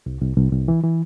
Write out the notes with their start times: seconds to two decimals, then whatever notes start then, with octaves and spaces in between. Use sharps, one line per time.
0.06 C2
0.21 C2
0.37 C2
0.52 C2
0.68 E3
0.84 E3